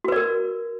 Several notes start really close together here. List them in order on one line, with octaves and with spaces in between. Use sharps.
F#4 B4 D5 A#4